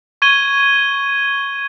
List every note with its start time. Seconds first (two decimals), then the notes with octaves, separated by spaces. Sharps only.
0.22 C#6 G#6 D#7 G7